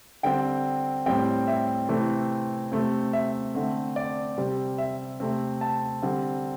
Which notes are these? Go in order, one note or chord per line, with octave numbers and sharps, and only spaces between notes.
D3 G3 C4 G5
A2 G3 C4 G5
E5
C3 E3 A3 C4
C3 A3 C4
E5
D3 A3 C4
D5
C3 G3 C4
E5
C3 A3 C4
A5
D3 G3 C4